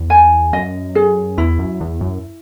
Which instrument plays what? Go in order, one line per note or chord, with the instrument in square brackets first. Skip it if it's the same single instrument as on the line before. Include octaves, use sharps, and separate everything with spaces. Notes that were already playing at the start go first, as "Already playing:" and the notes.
Already playing: [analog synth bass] E2
[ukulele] G#5
[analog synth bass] F#2 [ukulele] D#5
[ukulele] G#4
[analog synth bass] E2 [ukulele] E4
[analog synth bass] F#2
E2
F#2